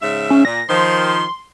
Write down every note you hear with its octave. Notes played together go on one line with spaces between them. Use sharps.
G#2 C#3 E5
C#4
A#2 A#6
D#3 F3 C6